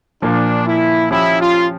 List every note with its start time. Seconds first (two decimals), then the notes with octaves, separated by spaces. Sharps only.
0.22 A#2 F3 A#3 D4
0.66 E4
1.11 F3 C#4 E4 G4
1.40 F4